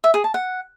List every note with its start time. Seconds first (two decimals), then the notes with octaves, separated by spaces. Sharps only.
0.04 E5
0.14 G#4
0.24 A5
0.34 F#5